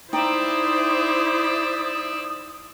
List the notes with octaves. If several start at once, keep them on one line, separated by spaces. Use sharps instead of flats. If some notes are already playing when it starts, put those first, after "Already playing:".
D#4 E4 C5 D5 E5 G5 D#6